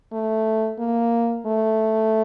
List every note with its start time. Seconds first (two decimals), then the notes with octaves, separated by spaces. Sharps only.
0.12 A3
0.79 A#3
1.46 A3